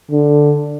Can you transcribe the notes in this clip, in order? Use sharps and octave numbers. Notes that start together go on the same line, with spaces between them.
D3